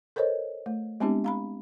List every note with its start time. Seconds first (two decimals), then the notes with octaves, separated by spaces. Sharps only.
0.16 A4 A#4 C5 C#5 D#5
0.66 A3
1.00 G#3 B3 C4 D4 E4 G4
1.24 F5 A#5 B5